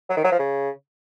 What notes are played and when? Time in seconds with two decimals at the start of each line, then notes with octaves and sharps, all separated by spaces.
0.09 F#3
0.17 D#3
0.24 F#3
0.32 F3
0.39 C#3